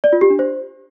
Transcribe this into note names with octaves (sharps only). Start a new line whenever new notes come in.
D5
F4
G4
D4
C5